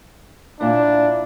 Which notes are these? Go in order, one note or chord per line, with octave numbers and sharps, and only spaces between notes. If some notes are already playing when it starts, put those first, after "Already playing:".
A#2 D4 E4